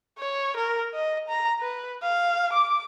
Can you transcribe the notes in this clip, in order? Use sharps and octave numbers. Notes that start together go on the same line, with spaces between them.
C#5
A#4
D#5
A#5
B4
F5
D6